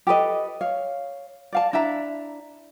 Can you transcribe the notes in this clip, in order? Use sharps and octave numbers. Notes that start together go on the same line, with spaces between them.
G4 A4 B4 D#5
C#5 F5
D5 F5 A5
D4 E4 E5 A#5